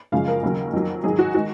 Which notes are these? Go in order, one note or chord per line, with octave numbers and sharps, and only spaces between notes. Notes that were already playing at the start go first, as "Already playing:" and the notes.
F#2 C#3 F3 G#3 F5
A#4
D#2 C#3 F#3
F2 D#3 F#3
G#2 D#3 F#3 G#4
F#4
D#3 G#3 F#4